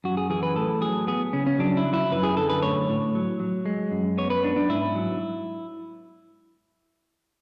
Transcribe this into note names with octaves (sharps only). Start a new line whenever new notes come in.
F#2 F#4
G#4
E3 G#4
B4
A2 A4
F#3 G#4
B3 G#4
C#3 C#4
C#4
F#3 D4
E4
F#3
E4
F#2 B4
G#4
D3 A4
B4
A2 C#5
A2
F#3
F#3
G#3
F#2
B3 C#5
B4
B3 D4
D4
G#2 E4
F#3